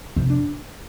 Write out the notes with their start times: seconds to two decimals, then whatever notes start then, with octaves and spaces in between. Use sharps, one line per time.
0.16 F2 C3 C4
0.30 D4